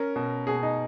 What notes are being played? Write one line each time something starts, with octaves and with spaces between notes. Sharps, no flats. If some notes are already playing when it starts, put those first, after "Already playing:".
Already playing: C#4 A#4
B2
B2 G#4
D#4